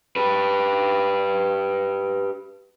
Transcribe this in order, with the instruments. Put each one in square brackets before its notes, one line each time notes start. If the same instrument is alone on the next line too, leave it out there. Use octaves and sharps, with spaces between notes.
[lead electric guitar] G4 B4